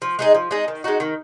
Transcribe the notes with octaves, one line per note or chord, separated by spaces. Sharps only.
F3
G#3 D#4 G#4
F3
G#3 D#4 G#4
D#3
G#3 D#4 F#4
D#3